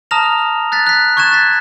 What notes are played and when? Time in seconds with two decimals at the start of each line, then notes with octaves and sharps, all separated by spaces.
0.11 A5 A#5 D#6 F6 A#6 F7
0.72 F#6 A6 B6
0.87 F#6 B6
1.17 C#6 F#6 G#6 A6 E7
1.32 A6 B6